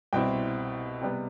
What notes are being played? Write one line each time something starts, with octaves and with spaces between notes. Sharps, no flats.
C2 B2 G3 C4 E4 G5
C3 G3 B3